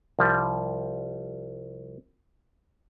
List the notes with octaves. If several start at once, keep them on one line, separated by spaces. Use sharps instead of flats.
C2 F3 G3